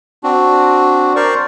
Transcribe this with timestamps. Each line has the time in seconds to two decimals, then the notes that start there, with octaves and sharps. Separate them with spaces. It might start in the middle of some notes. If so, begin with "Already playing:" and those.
0.23 C4 D4 F#4
1.16 A#4 C5 D5 C#6